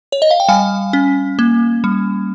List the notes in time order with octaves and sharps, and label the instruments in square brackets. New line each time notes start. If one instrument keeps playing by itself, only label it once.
[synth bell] C#5
D#5
F5
G5
G3 F5 G#5
C#4
A#3
G3